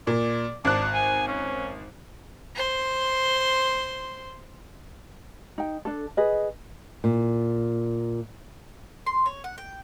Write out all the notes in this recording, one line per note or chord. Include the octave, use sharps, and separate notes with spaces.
A#2 D5
G#1 D4 F#6
G#5
C#4
C5 C6
D#4 G5
D4 A4
G#4 B4 D#5
A#2
C6
C#5
F#5
G5